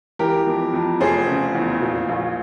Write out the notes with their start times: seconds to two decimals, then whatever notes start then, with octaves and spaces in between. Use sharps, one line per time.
0.19 E3 G4 A#4
0.47 F2
0.74 F2
1.00 F1 G#4 C5
1.28 C#3
1.55 E2
1.82 A#2
2.09 A#1